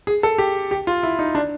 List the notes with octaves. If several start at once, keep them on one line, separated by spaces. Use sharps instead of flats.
G#4
A4
G4
G4
F4
E4
D#4
D4